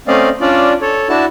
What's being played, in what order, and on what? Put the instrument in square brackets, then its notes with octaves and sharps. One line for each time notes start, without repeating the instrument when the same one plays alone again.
[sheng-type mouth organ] A3 C4 C#4 D5 D#5 F5
C#4 D4 F4 D5
A4 C#5
D4 E4 F#4 A5